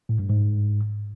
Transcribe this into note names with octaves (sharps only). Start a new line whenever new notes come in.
A2
G2
G#2